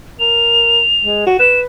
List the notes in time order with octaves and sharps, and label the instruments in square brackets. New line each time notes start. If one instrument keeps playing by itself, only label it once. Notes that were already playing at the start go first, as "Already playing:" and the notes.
[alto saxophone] A#4 [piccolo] F7
[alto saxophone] G#3
F#4
[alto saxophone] B4 [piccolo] E7